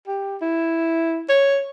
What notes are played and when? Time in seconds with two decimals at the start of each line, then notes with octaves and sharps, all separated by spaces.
0.08 G4
0.42 E4
1.30 C#5